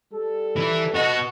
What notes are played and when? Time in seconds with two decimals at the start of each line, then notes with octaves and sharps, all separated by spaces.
0.13 G3 A4
0.56 E3 E4
0.94 B3 F#4 D#5